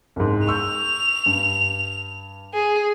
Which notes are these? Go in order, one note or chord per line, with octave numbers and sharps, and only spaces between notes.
C2 G#2
C#6 E6 G6 F7
G2
G#4